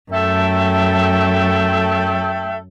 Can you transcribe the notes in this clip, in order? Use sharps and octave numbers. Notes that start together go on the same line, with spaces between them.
F#2 A3 A4 E5 G5